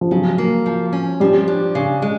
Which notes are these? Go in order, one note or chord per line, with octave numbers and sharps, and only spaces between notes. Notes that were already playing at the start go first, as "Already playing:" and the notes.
F3
C#3 F#3
A#3
F3
C#4
F3 G3
D4
C#3
G#3